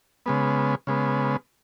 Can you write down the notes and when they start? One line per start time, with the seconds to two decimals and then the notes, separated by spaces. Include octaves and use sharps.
0.26 C#3 G#3 B3
0.87 C#3 G#3 B3